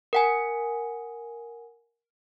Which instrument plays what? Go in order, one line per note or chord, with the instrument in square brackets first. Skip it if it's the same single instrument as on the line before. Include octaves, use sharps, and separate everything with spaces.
[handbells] A#4 F#5 G#5